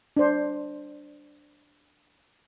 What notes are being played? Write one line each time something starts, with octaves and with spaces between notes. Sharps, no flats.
D4 C5